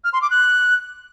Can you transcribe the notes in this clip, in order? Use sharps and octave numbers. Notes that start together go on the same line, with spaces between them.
F6
C6
D6
F#6